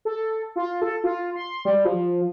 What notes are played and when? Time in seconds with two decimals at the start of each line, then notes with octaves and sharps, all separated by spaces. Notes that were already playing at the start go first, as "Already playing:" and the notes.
0.05 A4
0.56 F4
0.82 A4
1.04 F4
1.36 C6
1.65 G3
1.85 F3